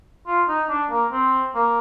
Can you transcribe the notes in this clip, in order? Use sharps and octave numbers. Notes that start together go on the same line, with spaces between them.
F4
D#4
D4
A#3
C4
A#3